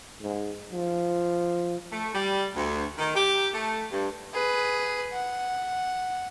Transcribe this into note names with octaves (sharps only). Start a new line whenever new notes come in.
G#2
F3
A3
G3
D2
D#3
G4
A3
G2
G#4 B4
F#5